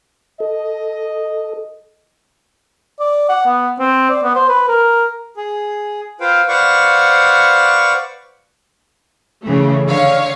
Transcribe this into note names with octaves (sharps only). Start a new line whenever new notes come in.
A4 D#5
D5
F#5
B3
C4
D5
B3
C5
B4
A#4
G#4
F4 B4 C5 F5 G5
B4 C5 D5 F5 F#5 C#6
C#3 E3 A3
D3 C#5 F5